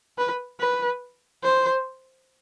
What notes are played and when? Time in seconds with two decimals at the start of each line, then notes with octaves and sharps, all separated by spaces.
0.18 B4
0.60 B4
1.44 C5